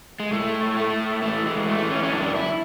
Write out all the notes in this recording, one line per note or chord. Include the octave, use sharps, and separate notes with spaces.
G#3
A2 A3
A2
A3
A2
E3 A3
G#3
E3
A3
E3
C#4
C#4
F#2 D4
E4